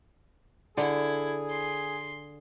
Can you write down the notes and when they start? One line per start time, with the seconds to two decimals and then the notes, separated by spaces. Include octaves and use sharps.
0.77 D3 E4 G#4
1.50 C6